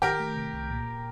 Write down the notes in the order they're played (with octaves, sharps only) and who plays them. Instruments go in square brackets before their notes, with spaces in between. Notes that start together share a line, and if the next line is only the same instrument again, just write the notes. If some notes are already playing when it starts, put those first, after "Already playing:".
[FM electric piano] D#3 [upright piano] G4 A#4
[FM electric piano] A3
C3
C2
A#2